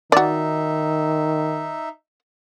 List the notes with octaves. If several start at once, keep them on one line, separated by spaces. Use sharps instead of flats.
D#3 D#4 F#4 D5 E5